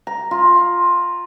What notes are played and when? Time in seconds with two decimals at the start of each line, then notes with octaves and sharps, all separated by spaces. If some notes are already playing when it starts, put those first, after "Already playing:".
0.07 A#5
0.31 F4